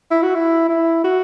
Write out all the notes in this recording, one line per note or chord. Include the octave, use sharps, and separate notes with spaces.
E4
F#4
E4
E4
F#4